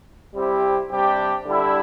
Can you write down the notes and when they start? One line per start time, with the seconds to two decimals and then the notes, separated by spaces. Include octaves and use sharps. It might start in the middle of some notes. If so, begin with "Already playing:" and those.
0.34 C3 G3 C4 E4 G4
0.89 C3 G3 D4 G4
1.46 D3 G3 E4